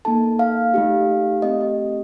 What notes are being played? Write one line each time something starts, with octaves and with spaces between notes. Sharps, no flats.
A#3 D#4 A4 A5
F5
A3 D#4 G4
A3 C4 G4 D#5
D#5